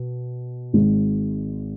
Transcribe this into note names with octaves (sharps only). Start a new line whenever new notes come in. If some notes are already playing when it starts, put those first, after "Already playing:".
Already playing: B2
G#1 G#2 G#3